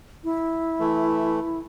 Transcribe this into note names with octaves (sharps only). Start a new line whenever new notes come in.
E4
E3 A3